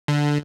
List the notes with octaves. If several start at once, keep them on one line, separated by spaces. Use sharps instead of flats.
D3